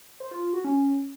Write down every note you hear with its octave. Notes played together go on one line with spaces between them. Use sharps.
C5
F4
F4
F#4
C#4